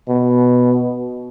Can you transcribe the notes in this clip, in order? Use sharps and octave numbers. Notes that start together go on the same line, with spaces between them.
B2